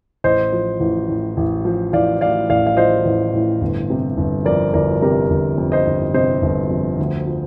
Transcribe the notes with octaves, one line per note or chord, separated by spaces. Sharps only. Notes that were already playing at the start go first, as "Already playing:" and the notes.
A1 C5 D#5
F3
A1
A2
A1
F3
A1 D5 F5
A2 D5 F5
A1 D5 F5
F5
F3 C5 D#5
A1
A2
G1
C3
G1
F2 A#4 D5
G1 A#4 D5
C3 G4 A#4
G1
F2
C5 D#5
G1
C3 C5 D#5
G1
F2
D2
F3